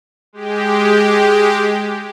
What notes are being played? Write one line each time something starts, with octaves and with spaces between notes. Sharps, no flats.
G#3 G4